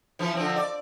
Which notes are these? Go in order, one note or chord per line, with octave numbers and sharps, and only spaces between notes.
E3 F3
D3 F3 C4
D5